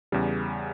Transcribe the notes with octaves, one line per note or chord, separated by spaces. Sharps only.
E2 C#3 G3